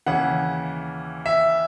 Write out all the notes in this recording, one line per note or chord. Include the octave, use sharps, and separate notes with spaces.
D#2 C#3 E3 F#5
E5